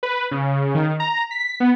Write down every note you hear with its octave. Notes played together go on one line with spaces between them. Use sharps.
B4
C#3
D#3
A#5
B6
B3